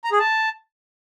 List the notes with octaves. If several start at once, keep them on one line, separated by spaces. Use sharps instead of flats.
A#5
G#4
A5